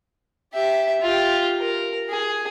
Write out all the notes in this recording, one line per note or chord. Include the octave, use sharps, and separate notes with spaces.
G4 E5
F4 G4
A#4
G#4